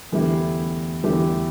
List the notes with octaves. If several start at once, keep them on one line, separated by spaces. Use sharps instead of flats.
E2 D3 A3 E4 G4
E2 D3 A3 E4 G4